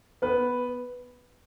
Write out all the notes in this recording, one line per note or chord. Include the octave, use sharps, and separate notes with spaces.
B3 B4